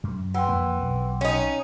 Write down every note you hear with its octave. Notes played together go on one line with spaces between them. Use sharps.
F#2
E3 F#5 G5 C6
F2 A#3
B1
C#4 D#4